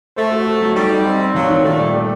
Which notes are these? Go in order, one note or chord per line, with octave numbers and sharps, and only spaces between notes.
A3 C5
F#4
F#4
F#3
G3 D#4
D#4
C4
C4
D#2 F#3
D#3
A#2 A3
G3
A3